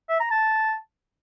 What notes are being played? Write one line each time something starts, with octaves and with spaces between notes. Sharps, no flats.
E5
A#5
A5